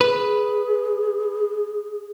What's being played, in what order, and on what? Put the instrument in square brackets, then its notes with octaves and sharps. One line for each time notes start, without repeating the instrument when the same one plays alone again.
[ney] G#4 [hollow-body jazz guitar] B4